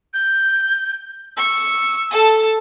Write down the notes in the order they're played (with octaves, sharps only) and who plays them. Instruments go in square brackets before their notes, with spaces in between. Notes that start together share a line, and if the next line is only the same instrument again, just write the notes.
[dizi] G6
[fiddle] C#6 [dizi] E6
[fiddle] A4 A5